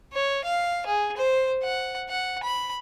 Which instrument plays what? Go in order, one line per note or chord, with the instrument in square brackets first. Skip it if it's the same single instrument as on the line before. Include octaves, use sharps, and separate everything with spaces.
[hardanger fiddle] C#5
F5
G#4
C5
F#5
F#5
B5